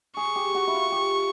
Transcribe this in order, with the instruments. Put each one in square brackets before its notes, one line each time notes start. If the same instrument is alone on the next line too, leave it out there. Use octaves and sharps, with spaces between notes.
[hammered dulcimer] G#4 [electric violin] C#6
[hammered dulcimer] G4
F#4
E4
F4
G4